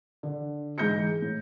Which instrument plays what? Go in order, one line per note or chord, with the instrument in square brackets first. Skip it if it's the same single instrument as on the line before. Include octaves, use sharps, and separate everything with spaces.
[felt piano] D3
G#2 E3 G6 A#6 C#7
A2